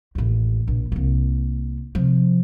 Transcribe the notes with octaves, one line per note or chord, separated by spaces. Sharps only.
A1 D#2
A#1
C2 A#3
C3 F3